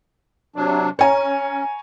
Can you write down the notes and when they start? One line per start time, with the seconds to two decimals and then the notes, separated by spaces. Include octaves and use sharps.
0.56 C3 F#3 D4
0.99 C#4 C#5 G#5 A#5